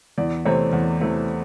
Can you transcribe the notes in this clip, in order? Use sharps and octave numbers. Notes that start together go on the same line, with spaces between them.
E2 D5
C3 E3 A3 C4 C#5
E2
C3 E3 A3 C4